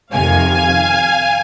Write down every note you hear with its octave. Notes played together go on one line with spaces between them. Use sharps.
F2 C3 D#3 F5 G#5